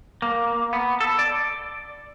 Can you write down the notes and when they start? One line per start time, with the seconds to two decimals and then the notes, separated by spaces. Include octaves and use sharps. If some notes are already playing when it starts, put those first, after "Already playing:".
0.22 A#3
0.73 B3
1.01 A4
1.19 D5